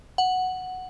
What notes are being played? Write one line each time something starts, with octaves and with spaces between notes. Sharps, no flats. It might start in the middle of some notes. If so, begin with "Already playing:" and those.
F#5